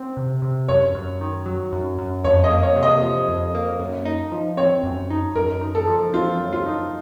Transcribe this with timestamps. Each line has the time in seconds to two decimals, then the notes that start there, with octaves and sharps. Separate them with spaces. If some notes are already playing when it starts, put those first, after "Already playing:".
Already playing: C4
0.17 C3
0.42 C3
0.68 F#2 C#5
0.95 F#2
1.21 D#3
1.46 F#3
1.72 F#2
1.98 F#2
2.24 F2 C#5
2.44 D#5
2.50 A#3
2.63 C#5
2.76 C3
2.83 D#5
3.02 F3
3.28 F2
3.55 A#3
3.79 F#2
4.05 D#4
4.32 F3
4.57 C4 C#5
4.83 F#2
5.10 D#4
5.35 F#2 A#4
5.61 D#4
5.75 A4
5.87 F3
6.13 C4 F4
6.40 F#2
6.53 F4
6.66 D#4